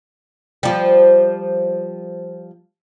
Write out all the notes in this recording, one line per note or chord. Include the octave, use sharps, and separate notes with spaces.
F3 G3